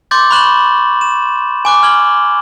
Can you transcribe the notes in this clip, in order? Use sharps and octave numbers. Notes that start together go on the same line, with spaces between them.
C6 D6 G6 A6
B5 C#6 F#6 E7 F#7
E7
G#5 D6 F#6
F6 G#6 F#7 G7